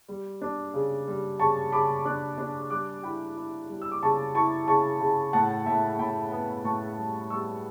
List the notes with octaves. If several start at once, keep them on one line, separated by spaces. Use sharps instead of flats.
G3
D4
C#3
G3
C#3 A5 C#6
C#3 B5 D6
D4 D6 F#6
D4
G3 D6 F#6
E4 G5 B5
E4
G3
E6
D6
C#3 A5 C#6
E4 A5 C#6
C#3 A5 C#6
C#3
A2 F#5 A5
A2 E5 G5
A2 G5 B5
B3
A2 A5 C#6
G3
G3 C#6 E6